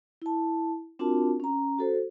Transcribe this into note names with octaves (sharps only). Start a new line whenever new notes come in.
E4 A5
C4 D4 F4 F#4 A#4 A5
C#4 A#5
F#4 A4 C5